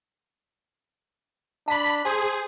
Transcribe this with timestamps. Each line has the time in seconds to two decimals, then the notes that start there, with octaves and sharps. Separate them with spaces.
1.68 D4 A5 B5 B6
2.05 G#4 C5